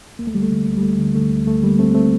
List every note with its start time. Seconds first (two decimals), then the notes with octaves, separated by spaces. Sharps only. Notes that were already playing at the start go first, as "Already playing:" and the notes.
0.19 D2 A#3
0.27 A3
0.35 D3 G3
0.43 A3
0.51 D3
0.68 D2
0.77 G3
0.83 D2 A3
0.99 D3
1.15 D3 A3
1.31 D2
1.47 D2 A3
1.63 D3 G3 A#3
1.79 D3 A3 C4
1.94 A3 C4